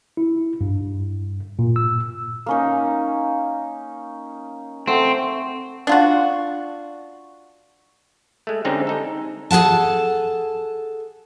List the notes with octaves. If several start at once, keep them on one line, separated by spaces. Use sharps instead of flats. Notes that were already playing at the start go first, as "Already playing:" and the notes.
E4
G2
A#2
E6
A#3 C#4 D#4
A3 C4 F#5
D4 F4 F#4
G#3 A3
D3 G3 G#3 C4 C#4 D#4
D#4 A4
G#4 A4 F#5 A5